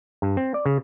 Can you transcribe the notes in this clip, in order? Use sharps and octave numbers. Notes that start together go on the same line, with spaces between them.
G2
C4
D5
C#3